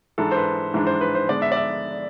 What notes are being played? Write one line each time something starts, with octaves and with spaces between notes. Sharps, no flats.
G#2 E3 G#3 D4 A4
C5
B4
G#2 E3 G#3 D4
C5
B4
C5
D3 G#3 B3 D5
E5
D5
E5